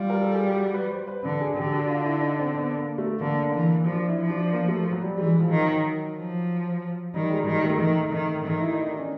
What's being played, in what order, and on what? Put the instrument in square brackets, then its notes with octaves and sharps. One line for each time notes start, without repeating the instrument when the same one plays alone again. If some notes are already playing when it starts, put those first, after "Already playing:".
Already playing: [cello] G3 [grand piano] F4
[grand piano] A#4
A4
G#4
G4
F#4
B4
C5
B4
[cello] D3 [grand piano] B4
[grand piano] G#4
[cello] D3 [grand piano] G4
[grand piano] F#4
F4
E4
D#4
C4
B3
A#3
A3
[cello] D3 [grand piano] A#3
[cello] E3
[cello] F3 [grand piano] D4
[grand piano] E4
[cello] F3
[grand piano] D4
A#3
A3
F#3
G3
[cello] E3 [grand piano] G#3
[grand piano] F3
[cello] D#3
[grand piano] F#3
[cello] F3
[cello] D#3 [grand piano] G3
[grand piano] G#3
G3
[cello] D#3 [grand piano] G#3
[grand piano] A3
[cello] D#3
D#3
D#3
[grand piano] E4
D#4
D4
C#4